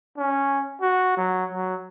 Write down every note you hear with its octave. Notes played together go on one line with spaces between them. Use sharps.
C#4
F#4
F#3
F#3